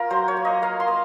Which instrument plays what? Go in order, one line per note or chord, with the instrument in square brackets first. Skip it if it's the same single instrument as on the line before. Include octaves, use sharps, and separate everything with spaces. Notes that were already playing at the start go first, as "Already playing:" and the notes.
Already playing: [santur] A#3 F4 A#4
F#3 C5
C#5
A#3
D#5
A#3 F5
C6
A#3